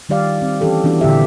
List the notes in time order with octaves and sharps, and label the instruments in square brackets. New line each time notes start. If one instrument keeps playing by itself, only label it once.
[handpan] D#3 G3 G4 D5 F5
C4
E3 C#4 G4 A4
E3 B3 D4 F#4
A#2 D3 C4 G4 E5